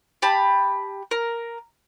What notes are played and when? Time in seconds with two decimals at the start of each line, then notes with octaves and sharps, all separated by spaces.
0.22 G4 A5 B5
1.11 A#4